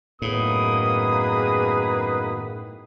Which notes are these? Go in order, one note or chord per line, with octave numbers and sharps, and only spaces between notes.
F#2 A2 D#3 A#3 B3 G#4 B4 D#6